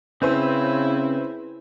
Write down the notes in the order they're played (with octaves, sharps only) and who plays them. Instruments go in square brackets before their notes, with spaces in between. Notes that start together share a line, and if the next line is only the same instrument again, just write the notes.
[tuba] C#3 [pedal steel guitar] C4 [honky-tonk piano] C#4 B4 C5 [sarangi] E4